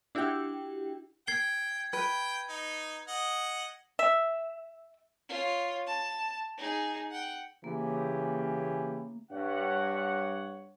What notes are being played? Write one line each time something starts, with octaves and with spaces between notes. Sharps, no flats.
D4 E4 F#4 G4 G5
G5 G#6 C7 G7
B4 G5
D#4
D#5 F#5
E5
F4 C#5
A5
D#4 G#4
F#5 G5
C#3 E3 A#3 G4
G2 C#5 F#5